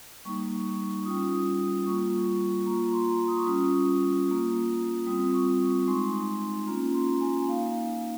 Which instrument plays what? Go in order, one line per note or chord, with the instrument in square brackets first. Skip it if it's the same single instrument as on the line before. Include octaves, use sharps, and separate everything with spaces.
[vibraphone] G3 A#3 D#4 C#6
G3 C#4 F4 D#6
D#6
G3 A#3 F4 C#6
A#3 F4 A#5
A#5
C6
D#6
C#6
G3 C#4 F4 D#6
A#3 F4
G3 C4 F4 D#6
C#6
C#6
G#3 D#4 C6
A#3 C#4 F4 A#5
C6
G#5
A#3 D#4 F5